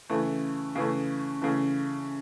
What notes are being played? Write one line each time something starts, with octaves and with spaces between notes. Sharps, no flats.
C#3 E3 A3
C#3 E3 A3
C#3 E3 A3